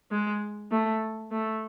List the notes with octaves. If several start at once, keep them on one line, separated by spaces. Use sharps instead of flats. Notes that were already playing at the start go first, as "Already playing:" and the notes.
G#3
A3
A3